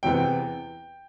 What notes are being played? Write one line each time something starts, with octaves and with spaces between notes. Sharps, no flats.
E2 C3 E3 B3 G5